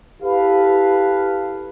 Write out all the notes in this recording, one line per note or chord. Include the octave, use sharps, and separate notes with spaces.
E4 G4 A4 B4 F5